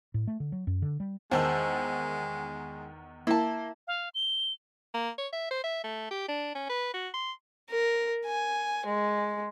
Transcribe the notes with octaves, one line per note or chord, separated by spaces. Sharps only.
A2
A3
D3
F#3
F#2
D3
G3
E2 D#3 G#3 C5 A5 E6
A#3 E4 A5
F5
G7
A#3
C#5
E5
C5
E5
A3
G4
D4
C#4
B4
F#4
C6
A#4
G#5
G#3